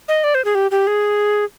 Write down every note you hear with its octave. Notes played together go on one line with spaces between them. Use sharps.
D#5
D5
C5
G#4
G4
G4
G#4